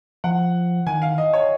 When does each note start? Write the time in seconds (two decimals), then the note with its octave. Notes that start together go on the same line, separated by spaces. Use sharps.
0.24 F3 F#5
0.87 D#3 G#5
1.02 F5
1.18 D#5
1.33 C#5